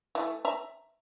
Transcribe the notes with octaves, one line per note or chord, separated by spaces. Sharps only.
E3 A3
E5 A#5